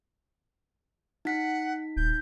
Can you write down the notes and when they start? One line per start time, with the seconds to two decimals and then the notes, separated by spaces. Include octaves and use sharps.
1.25 D#4 F#5 B6
1.96 D#1 G6